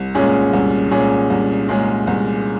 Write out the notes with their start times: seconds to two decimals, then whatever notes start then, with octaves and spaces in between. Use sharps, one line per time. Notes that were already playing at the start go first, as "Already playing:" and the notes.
Already playing: C2
0.15 A#2 G#3 C#4 G#4
0.53 C2
0.91 A#2 G#3 C#4 G#4
1.30 C2
1.68 A#2 G#3 C#4 G#4
2.07 C2